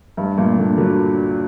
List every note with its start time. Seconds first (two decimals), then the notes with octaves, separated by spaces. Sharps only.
0.17 G2
0.37 G2 A#2
0.58 A#2 D3
0.77 D3 F#3